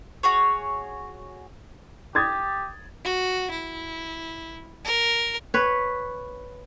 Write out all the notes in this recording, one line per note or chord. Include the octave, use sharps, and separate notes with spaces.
F#4 G#4 C#5
G4 D#6 G#6 A6
F#4
E4
A#4
B4 C#5